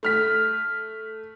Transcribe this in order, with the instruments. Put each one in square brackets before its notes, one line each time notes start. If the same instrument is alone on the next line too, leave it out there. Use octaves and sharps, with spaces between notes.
[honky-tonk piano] A3 F6 B6